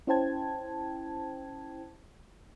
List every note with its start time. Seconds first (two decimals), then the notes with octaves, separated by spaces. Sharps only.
0.07 C#4 E4 C5 G5 A5 G#6